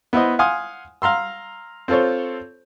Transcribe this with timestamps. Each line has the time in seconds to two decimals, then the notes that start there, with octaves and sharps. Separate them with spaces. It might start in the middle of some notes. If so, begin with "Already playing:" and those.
0.13 B3 E4 C5 D#5
0.39 F5 F#5 G#5 C6 D#6
1.02 F5 A#5 C6 E6
1.88 C4 F4 A4 C5 C#5